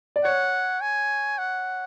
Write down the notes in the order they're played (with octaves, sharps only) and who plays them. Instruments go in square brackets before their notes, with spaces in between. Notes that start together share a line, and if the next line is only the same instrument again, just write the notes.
[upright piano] D5
[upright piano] C#5 [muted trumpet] F#5
[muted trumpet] G#5
F#5